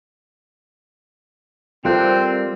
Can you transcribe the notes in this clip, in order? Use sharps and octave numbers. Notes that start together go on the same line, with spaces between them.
G3 C4 F4 A4 A#4 C5 F#6